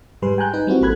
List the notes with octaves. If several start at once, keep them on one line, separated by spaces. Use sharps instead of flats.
G#2 G3 G#4 B4 C6
G5 G#5 A#5 F#6 G6
D#4 B4
G3 C4 E4 F#4
A1 A#3 A4 B5 F#6 G#6